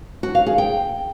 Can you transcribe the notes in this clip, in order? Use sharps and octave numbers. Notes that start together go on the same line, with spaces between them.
F#4
F5
G#4
G5